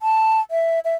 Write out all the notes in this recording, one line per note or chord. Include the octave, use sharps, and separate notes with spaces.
A5
E5
E5